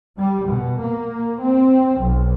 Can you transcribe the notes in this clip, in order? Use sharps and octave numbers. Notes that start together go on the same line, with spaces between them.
G3
B2
A#3
C4
B1